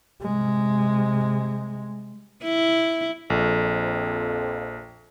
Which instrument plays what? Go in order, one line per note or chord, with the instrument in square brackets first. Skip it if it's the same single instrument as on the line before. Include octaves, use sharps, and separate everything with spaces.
[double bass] C3 G#3
[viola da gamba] E4
[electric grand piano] A#1 [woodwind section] F2